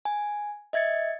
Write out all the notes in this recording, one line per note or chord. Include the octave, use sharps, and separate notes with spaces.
G#5
D#5 E5 G#6 A6 C#7